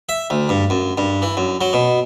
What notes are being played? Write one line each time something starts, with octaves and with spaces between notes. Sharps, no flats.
E5
D2
G2
F#2
G2
E3
F#2
F#3
B2